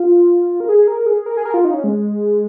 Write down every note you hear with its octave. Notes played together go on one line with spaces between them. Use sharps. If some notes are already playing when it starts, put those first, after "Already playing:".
Already playing: F4
A#4
G#4
A#4
G#4
A#4
G#4
A#4
F4
D#4
C#4
G#3